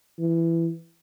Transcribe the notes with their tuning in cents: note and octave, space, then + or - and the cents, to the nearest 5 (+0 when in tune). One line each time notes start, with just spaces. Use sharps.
E3 +15